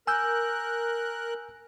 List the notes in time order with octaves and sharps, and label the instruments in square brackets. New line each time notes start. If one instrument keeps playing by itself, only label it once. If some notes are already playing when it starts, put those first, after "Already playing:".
[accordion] A#4 F#6 [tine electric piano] G#5 E6 G6